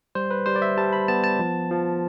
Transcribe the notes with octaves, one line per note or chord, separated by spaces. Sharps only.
G3 C5
B4
G3 C5
D5
E5
G3 A5
B5
B3 A5
A5
F3
F3